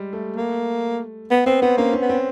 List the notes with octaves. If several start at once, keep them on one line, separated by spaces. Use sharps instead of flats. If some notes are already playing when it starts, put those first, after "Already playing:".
Already playing: G3 G#3
A3
A#3
B3
B3 C4
B3 C4
A#3 C#4
C#4
B3
C4